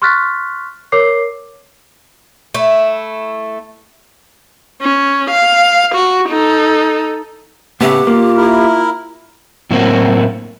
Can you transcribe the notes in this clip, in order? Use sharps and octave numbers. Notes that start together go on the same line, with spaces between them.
C6 C#6 F6 F#6 A6 B6
A#4 C#5 D6 C7
A3 E4
C#4
F5
F#4
D#4 A4
A2 C#3 B3 G4 E5 F#5
A#3 F4
E4 A#4
A2 F#3 A#3 C4 E4 F#4